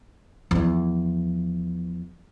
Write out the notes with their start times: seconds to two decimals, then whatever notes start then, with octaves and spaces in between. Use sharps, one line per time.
0.51 E2 F3